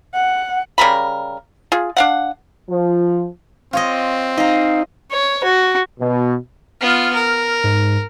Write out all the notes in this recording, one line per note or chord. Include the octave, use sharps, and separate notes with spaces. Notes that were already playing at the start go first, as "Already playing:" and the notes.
F#5
C#3 G3 A#4 B5
F4 G#4
D4 F5 F#5
F3
C4 F4 C#5 D#5
D#4 D#5 F5 A#5
C#5
F#4
B2
B3 F4 F6
A#4
G#2